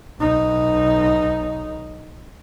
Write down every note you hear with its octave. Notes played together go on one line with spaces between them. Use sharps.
B1 D#4